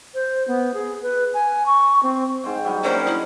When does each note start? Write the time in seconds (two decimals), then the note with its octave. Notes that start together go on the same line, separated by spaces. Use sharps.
0.14 C5
0.48 B3
0.74 G#4
1.02 B4
1.34 G#5
1.66 C#6
2.03 C4
2.44 G#2 C5 G5
2.65 F#3 G3 D#4
2.83 A#3 C#4 D4 C5
3.06 E4 D#5